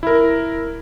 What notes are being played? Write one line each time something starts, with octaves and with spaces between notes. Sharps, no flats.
E4 A#4